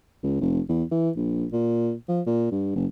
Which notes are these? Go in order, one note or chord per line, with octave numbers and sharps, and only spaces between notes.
C#2
F1
E2
E3
A#1
A#2
F3
A#2
G2
F#1